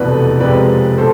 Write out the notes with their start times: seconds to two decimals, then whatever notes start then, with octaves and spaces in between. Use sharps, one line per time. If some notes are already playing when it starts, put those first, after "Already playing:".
Already playing: F1 E2 B2 A3 B4 D5
0.40 F2 C3 G#3 B4 D5
0.98 B2 A4 C5